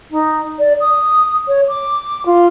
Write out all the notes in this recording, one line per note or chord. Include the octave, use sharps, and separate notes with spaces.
D#4
D5
D#6
C#5
D6
F4